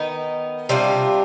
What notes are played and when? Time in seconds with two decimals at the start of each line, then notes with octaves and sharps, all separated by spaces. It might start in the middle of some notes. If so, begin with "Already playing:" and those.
Already playing: D#3 B3 D#4
0.69 C3 G3 D4 F4